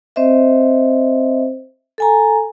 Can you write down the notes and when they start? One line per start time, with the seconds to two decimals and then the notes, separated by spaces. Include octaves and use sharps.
0.16 C4 C5 D#5 E5
1.98 A4 G#5 A#5